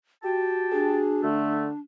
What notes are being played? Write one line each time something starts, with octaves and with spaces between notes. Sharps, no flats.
F#4 G4 G5 A5
D4 G#4
D3 A3